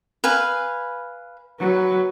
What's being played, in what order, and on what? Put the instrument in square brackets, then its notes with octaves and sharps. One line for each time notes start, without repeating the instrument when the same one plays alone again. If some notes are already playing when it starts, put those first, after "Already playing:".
[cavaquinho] B4 F5 G#5
[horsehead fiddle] F#3 B4